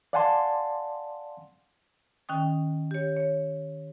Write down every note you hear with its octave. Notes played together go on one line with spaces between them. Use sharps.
D5 F5 F#5 G#5 A5 C6
D#3 C#4 G5 D#6
G4 C#5
C#5